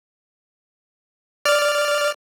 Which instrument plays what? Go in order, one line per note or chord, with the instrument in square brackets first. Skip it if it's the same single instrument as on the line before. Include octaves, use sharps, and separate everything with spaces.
[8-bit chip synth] D5 F6